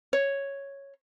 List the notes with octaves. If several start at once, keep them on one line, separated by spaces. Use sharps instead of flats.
C#5